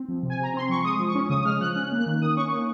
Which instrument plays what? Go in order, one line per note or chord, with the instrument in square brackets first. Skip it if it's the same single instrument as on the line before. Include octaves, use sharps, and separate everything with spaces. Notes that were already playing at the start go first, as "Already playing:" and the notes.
Already playing: [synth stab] C4
F3
C3
G#5
C3 A#5
C4 C6
F3 C#6
G#3 D#6
F3
C#6
C#4
C#3 D#6
D#6
G#3 F6
F3 F#6
C#4 F#6
A#3
F#6
D#3
D#3 D#6
C#4 C#6
A#3